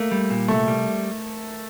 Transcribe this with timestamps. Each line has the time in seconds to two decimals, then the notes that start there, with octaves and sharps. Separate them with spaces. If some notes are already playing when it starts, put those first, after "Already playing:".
Already playing: A3 A#3
0.12 G3
0.30 A#2
0.48 C2 A3
0.68 G3